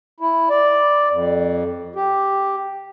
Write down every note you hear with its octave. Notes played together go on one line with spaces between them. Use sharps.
E4
D5
F2
G4